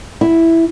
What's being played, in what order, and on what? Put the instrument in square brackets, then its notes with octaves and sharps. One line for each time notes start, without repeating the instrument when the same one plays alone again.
[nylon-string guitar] E4